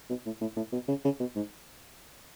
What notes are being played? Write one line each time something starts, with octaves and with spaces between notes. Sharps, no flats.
B2
A2
A2
A2
B2
C#3
C#3
B2
G#2